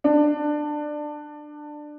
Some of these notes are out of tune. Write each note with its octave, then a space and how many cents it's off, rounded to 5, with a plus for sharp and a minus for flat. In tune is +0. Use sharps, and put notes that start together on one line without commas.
D4 +20